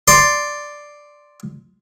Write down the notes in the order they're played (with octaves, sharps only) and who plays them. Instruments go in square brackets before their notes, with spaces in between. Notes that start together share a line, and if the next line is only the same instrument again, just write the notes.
[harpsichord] D5 C6